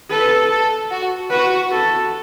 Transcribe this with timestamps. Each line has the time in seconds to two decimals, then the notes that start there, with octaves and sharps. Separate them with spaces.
0.10 A4 B4
0.50 A4
0.91 F#4
1.30 F#4 B4
1.72 A4